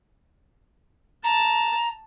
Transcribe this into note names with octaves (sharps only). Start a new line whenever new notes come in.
A5 A#5